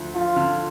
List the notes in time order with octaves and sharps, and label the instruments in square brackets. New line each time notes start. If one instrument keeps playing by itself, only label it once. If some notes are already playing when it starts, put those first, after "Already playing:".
Already playing: [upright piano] D2 F3
[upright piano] F3 [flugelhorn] F4
[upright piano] D3